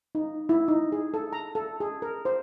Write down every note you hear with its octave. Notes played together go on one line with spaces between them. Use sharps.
D#4
E4
D#4
G#4
A4
A#5
A4
G#4
A#4
C5